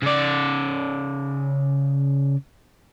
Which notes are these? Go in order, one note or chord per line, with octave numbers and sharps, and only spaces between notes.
C#3 D5